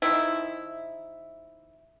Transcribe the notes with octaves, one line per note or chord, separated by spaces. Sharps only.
D#3 F3 E4